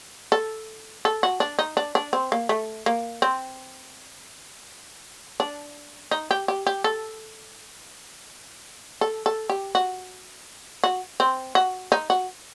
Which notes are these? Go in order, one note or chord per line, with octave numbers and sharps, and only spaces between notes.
A4
A4
F#4
D4
D#4
D4
D4
C4
A#3
A3
A#3
C4
D4
D#4
G4
G4
G4
A4
A4
A4
G4
F#4
F#4
C4
F#4
D#4
F#4